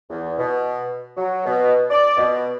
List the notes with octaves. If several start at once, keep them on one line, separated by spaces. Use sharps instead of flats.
E2
B2
F#3
B2
D5
B2